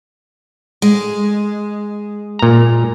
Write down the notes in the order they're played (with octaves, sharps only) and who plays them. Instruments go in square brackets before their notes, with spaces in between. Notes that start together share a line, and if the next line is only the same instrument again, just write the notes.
[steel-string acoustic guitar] G#3
[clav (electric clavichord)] A#2 A#5